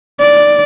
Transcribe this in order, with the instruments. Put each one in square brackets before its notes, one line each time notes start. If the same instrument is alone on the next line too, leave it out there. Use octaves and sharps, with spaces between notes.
[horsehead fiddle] D5